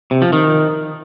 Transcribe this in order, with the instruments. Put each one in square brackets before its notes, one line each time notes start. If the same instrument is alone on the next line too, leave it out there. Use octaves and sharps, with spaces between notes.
[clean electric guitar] C3
F3
D#3